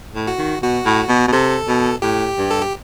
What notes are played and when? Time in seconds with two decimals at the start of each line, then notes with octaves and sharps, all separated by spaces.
0.15 A2
0.27 F#4
0.38 D#3
0.62 B2 F#4
0.85 A2
1.09 B2
1.28 B2
1.32 C3 A4
1.68 B2
2.02 A2 G4
2.38 G2
2.51 A4
2.62 G4